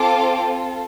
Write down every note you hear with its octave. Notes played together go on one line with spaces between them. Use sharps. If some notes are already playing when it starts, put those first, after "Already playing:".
Already playing: C4 F4 A4 D6